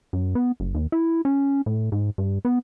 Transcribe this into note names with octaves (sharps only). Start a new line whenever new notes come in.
F#2
B3
F#1
D#2
E4
C#4
A2
G#2
G2
B3